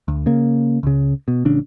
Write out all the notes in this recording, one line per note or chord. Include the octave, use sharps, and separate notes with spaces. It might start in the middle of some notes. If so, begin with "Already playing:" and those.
D2
C#3 A#3
C#2 C#3
B2
A1 C#3 D4